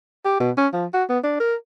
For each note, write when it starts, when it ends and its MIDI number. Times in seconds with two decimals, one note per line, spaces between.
0.25 0.36 67
0.40 0.51 47
0.57 0.67 61
0.73 0.86 53
0.94 1.04 66
1.09 1.19 59
1.24 1.37 62
1.40 1.55 70